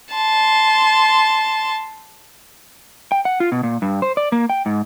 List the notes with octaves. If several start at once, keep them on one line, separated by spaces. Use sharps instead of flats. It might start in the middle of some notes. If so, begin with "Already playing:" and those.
A5 C6
G5
F#5
F4
B2
A#2
G2
C5
D5
A#3
G5
G#2